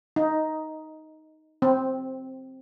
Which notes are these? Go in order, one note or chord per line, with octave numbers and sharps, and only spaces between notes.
D#4
C4